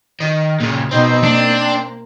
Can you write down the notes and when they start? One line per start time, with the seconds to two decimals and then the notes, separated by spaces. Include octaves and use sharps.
0.20 D#3
0.60 A#2 C#3
0.91 B2 B3 C4 D#4
1.24 A#3 D4